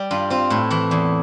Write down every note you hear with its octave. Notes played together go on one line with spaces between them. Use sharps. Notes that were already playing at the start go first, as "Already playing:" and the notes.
Already playing: G3 G4
G2 F4
C4 F4
A2 E4
E3 E4
E2